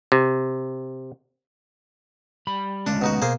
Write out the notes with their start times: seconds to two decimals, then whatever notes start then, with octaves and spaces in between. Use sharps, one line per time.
0.12 C3
2.47 G3 B5
2.87 D2 G#3 C#4 D4
3.02 B2 D#4 F#4
3.22 B2 A#3 G#4 C5